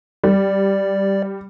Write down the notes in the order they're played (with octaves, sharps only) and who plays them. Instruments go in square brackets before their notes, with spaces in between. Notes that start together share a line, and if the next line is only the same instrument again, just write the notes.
[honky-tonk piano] G3 [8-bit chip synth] D5